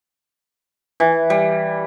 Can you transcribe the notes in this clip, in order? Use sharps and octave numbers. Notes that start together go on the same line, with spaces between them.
E3
G3